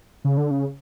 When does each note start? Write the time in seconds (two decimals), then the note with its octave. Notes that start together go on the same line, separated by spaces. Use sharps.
0.24 C#3
0.37 D3
0.51 C#3